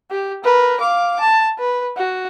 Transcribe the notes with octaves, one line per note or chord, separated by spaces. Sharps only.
G4
A#4 B4
F5 D6
A5
B4
F#4